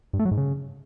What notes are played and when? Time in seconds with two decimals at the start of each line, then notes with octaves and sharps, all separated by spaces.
0.13 G2
0.19 A3
0.25 F#3
0.31 G#2
0.37 C#3